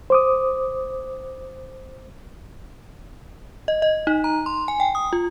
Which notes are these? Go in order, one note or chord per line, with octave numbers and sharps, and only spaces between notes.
C5 D6 D#6
D#5
D#5
D#4
A#5
C6
G#5
G5
D#6
F4